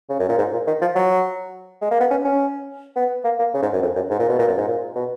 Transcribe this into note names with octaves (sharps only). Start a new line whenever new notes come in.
C#3
F#2
A#2
G#2
A#2
D#3
F3
F#3
G#3
A#3
B3
C#4
C#4
B3
A#3
A#3
C#3
G#2
F#2
F2
F#2
G#2
A#2
B2
A#2
F#2
G#2
A#2
B2